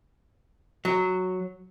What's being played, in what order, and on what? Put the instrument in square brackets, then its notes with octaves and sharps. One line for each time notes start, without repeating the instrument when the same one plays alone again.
[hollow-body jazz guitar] F#3